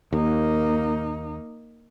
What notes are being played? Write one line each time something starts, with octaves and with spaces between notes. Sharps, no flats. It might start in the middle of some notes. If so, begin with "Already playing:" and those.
D#2 A#3 D#4